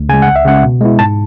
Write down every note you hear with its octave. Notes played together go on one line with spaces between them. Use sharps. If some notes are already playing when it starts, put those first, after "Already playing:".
Already playing: D2
C#3 G#3 G#5
F#5
C#2
E5
C#3 G#3 C#4 F#5
B2
G#3 B3 E4
G#2 A5